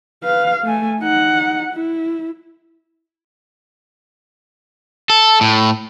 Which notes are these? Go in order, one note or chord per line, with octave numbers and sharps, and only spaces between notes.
B4 F5
A3 G#5
D#4 F#5
E4
A4
A2